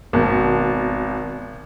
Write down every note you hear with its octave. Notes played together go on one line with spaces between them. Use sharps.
G#1 B2